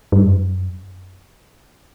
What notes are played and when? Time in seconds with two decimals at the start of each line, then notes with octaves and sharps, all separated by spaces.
0.12 G2
0.24 F#2